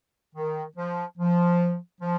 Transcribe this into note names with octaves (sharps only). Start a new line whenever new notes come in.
D#3
F3
F3
F3